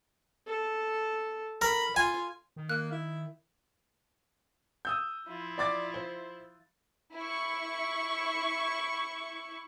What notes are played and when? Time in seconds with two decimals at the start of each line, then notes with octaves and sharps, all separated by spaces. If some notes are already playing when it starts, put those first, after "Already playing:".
0.47 A4
1.62 A#4 B5
1.96 F4 G#5
2.56 D#3
2.69 A#3 F#6
2.92 E4
4.85 D#6 E6 G6
5.28 F3 E4 F4
5.58 D5 D6 A6
5.94 C5
7.15 E4 C#6